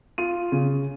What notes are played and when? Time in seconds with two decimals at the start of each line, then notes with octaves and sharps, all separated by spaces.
0.18 F4 D#7
0.52 C#3